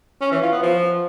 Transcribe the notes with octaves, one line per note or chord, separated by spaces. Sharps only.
C#4
E3
F4
B3
F3